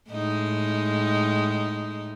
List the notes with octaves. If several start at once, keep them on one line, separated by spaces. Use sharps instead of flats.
A2 G#3 D#4